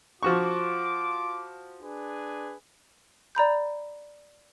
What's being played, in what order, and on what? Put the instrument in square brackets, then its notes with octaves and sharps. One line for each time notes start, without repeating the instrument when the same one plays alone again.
[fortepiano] F3 F#4 C#6 [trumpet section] F4 D6
[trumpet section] D4 G#4 B4
[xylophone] D5 A#5 B5 G6